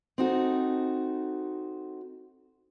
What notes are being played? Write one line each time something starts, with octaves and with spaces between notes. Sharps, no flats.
C4 D#4 F#4 A4